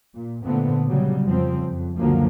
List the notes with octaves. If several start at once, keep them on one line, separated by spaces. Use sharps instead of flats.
A#2
A#2 D3 A3 B3 C4
C#3 F#3 G3
F2 C#3 F3 C4
F2
C#2 F#2 D3 F3 F#3 A#3